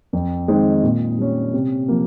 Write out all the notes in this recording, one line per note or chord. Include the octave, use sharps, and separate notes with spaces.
F2
D#3 G#3 C4 D#4
A#2
G3 C#4
C3
F3 A#3